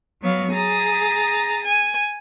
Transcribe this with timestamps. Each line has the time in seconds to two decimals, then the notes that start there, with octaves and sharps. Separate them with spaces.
0.21 F#3 B3 C#5 F5
0.52 G#4 A#5 D#6 A6
1.65 G#5